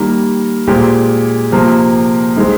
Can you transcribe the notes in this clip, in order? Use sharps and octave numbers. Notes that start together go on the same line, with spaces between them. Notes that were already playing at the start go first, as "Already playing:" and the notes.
Already playing: D#3 G3 A#3
A#2 G#3 C4 G4
C3 F3 A#3
D#3 G#3 C4